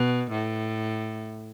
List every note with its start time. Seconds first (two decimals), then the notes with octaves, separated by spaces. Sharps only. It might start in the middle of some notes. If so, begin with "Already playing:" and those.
Already playing: B2
0.31 A2